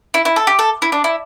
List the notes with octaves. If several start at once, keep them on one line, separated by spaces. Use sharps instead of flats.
E4
E4
A4
G4
A4
E4
D4
E4